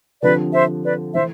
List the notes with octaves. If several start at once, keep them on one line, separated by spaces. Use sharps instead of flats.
D3 F3 C4 G4 B4 D5
C5 E5
B4 D5
E3 A3 C5 E5